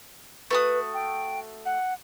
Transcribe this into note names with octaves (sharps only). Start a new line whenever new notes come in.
A3 F#4 B4 D#6
G5
F#5